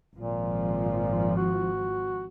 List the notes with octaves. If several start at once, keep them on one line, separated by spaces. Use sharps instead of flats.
G#1 A#2 F3
F#4